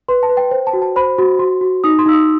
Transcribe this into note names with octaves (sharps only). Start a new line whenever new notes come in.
B4 C6
A5
B4
G5
C5 G5
A5
F#4
A5
C5 B5
F#4
F#4 C6
F#4
D#4 D#6
C6
D#4 E6
D#6